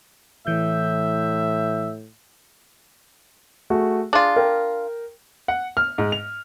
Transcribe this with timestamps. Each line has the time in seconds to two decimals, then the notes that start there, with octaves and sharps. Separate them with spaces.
0.47 A2 E3 E5 G6
3.70 A3 F#4 G#4
4.13 D4 F4 G#4
4.36 A#4 G5
5.48 F#5
5.77 F6
5.98 G#2
6.12 F7